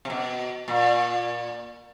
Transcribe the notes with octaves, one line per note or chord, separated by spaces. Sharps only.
C3
B2
A#2